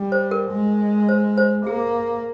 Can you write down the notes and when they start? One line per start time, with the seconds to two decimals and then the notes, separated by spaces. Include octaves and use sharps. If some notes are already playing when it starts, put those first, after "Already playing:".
Already playing: G3
0.12 C5
0.31 A#4
0.51 G#3
1.09 C5
1.37 C5
1.66 A#3 G#4